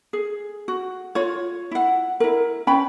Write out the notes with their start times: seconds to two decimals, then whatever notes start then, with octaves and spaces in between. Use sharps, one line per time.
0.13 G#4
0.68 F#4
1.15 F4 C#5
1.71 E4 F#5
2.20 E4 A#4
2.67 C#4 B4 G5 B5